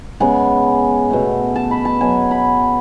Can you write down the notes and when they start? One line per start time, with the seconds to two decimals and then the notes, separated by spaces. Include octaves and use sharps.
0.20 C#3 G#3 B3 G#5
1.11 B2 A3
1.55 A5
1.71 B5
1.85 A5
2.01 B2 F#3 B3 G#5
2.31 B5